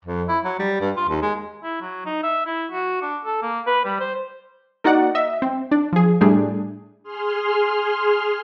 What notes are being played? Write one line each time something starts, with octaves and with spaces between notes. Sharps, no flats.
F2
E4
F#3
G3
G2
F4
D#2
G#3
E4
F#3
D#4
E5
E4
F#4
D4
A4
A#3
B4
G3
C5
A#3 D#4 F#4 D5 F#5
D#5 E5
C4
D4
F3 G#4
A2 G3 A3 D4 G#4
G#4 C6 F6